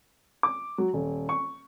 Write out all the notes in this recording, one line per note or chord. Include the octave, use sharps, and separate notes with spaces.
D6
F#3
D#1
C#6